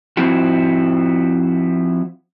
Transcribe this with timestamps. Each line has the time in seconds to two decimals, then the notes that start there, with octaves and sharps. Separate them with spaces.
0.17 F3 C4 E4 F#4